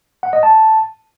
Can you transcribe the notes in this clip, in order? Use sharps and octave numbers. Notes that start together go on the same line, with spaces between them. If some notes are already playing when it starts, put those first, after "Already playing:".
F#5
D#5
A5